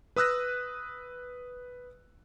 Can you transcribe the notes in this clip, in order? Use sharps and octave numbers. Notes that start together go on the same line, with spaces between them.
B4 D#6 E6 F#6 A#6